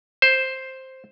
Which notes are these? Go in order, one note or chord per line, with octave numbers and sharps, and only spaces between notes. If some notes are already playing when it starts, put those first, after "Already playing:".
C5